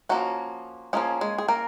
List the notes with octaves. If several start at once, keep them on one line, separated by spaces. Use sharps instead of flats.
F3 F#3 A#3 C#4 F#4
F3 G#3 A#3 C#4 G#4
G#3 G#4
G#4
A#3 A#4